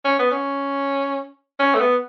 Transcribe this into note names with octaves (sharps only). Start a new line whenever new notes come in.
C#4
B3
C#4
C#4
A3
B3